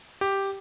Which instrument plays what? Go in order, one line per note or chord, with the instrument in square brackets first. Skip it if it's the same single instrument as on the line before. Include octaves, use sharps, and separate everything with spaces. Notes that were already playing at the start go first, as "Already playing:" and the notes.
[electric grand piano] G4